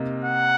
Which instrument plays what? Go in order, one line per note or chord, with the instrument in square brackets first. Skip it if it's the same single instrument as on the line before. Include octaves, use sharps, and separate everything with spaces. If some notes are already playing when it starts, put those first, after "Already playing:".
Already playing: [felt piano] C3 A#3 D#4
[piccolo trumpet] F#5